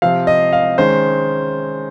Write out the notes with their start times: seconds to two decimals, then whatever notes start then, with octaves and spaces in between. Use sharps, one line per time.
0.02 C3 F3 C4 F5
0.27 D#5
0.53 F5
0.78 D#3 G#3 C#4 C5